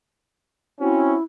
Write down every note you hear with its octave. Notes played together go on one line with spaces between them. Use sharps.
C4 C#4 E4 F#4